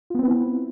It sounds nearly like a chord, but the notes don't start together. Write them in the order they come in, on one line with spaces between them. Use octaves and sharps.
F4 B3 C4 B4 E4